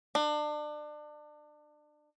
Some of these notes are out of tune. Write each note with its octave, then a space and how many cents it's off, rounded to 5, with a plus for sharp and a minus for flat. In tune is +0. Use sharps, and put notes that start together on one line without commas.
D4 +30